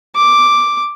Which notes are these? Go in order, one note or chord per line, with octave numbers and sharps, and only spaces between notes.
D6